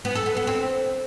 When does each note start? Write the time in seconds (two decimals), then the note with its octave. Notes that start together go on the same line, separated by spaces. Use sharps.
0.05 B3
0.15 A4
0.26 B3
0.37 B3
0.47 C4